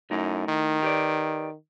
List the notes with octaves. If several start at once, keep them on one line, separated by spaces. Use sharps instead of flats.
F#2 A3 D#4 E4
D#3
G4 B4 D5